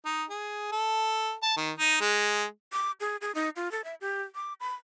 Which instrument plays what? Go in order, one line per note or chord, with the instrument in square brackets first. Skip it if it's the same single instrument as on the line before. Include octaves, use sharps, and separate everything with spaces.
[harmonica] D#4
G#4
A4
A5
D#3
D#4
G#3
[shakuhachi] D6
G#4
G#4
D#4
F4
A4
E5
G4
D6
B5